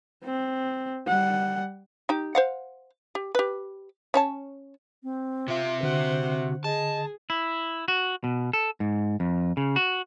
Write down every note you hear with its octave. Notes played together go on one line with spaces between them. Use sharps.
C4
G3 F#5
D#4 G4
C5 F5 F#5
G4
G4 B4
C#4 C#5 A5
C4
C3 F4 E5
D3 F#4 C5 F#5
G#4 D#5 A5
E4
F#4
B2
A4
G#2
F2
C#3
F#4